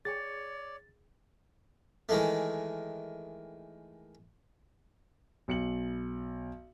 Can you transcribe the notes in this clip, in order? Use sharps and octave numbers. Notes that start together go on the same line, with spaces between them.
G#4 C#5 D5 G5 G#5 A6
D#3 E3 G#3 A3
B1 C#7 F#7